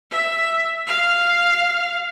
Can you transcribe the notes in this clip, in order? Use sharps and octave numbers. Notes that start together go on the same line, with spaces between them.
E5
F5